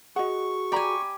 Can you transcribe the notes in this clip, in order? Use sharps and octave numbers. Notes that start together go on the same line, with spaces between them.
F#4 G#4 D#5 F#5 C#6
G4 D5 G#5 A#5 B5